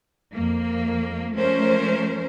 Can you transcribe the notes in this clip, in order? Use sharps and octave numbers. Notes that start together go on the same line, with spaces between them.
F2 A#3
F3 A3 C#4 A#4 C5